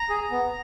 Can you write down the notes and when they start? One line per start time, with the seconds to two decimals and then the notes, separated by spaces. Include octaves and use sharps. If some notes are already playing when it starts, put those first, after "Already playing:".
Already playing: A#5
0.09 G#4
0.31 B3